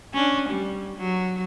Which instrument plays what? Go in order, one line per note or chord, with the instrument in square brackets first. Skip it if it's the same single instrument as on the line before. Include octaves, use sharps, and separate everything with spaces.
[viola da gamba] C#4 D4
G3
F#3